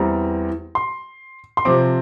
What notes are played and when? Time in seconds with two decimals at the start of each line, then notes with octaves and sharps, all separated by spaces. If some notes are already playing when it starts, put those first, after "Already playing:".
Already playing: E2 E3 G3 C4 A#5
0.75 C6
1.57 C6
1.65 C3 F3 C4 D6